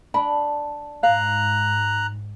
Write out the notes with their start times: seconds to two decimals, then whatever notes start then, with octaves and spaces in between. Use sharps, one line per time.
0.14 D4 B5
1.03 G#2 F5 A#5 F#6